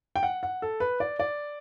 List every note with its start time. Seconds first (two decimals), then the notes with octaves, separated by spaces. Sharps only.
0.16 G5
0.23 F#5
0.43 F#5
0.62 A4
0.80 B4
1.00 D5
1.20 D5